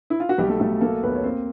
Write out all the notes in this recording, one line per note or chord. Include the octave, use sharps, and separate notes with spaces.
E4
F4
F#4
B1 G3 G4
A3 A4
B1 A3 A4
A3 A#3 A4
D#2 B3 B4
C#5
A#3 C4 C5